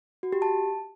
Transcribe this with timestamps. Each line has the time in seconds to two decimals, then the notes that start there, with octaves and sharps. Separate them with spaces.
0.23 F#4
0.32 G4
0.42 A5